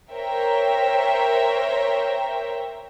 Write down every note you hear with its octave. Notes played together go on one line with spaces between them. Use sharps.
A#4 C5 C#5 E5 G5 A#5